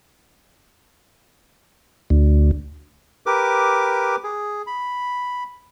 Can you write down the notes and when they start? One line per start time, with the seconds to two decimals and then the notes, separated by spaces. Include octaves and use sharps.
2.10 D2
3.26 G4 A#4 B4 D6
4.24 G#4
4.67 B5